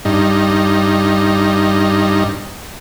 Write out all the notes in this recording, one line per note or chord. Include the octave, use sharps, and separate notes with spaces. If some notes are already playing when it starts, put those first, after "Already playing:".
G2 D#4